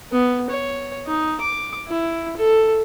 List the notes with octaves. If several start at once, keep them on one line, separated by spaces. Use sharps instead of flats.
B3
C#5
D#4
D6
E4
A4